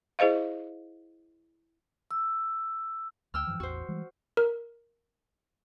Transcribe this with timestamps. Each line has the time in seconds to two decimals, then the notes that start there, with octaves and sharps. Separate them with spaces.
0.19 E4 G#4 C5 D#5 F5
2.11 E6
3.34 D2 G5 E6 F6
3.47 G2 E3 F3
3.60 A1 E2 F#4 C5
3.89 E3 G3 G#3
4.37 A#4